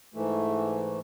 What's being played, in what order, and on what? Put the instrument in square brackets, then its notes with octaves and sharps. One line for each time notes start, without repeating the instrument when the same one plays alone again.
[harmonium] G#2 E3 A3